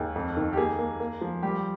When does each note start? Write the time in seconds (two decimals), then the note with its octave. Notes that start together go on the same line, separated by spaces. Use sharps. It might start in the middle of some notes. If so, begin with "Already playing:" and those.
Already playing: D#2 G#4
0.16 F2
0.37 D#3
0.53 G4
0.57 A#3 G#4
0.79 A#3
1.00 A#3
1.21 F3
1.43 G3 G4